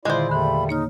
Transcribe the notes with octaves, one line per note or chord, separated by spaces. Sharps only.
A#2 D3 D#3 G#3 E4 F4 C5 D5
E2 A#2 D3 G3 A3 B5
A#3 D#4 C#5 F6